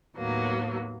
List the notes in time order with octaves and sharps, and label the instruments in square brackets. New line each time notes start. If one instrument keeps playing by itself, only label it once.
[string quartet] D#2 A2 F#3 A#3 B3